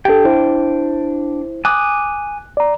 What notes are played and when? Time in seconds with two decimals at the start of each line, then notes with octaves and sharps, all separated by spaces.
0.05 D4 G4 A4 G5
0.25 E4 C5
1.65 G#5 D6 D#6 F#6
2.57 D5 A#5